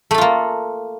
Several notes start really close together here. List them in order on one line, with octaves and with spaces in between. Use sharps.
A3 A4 F4 A#3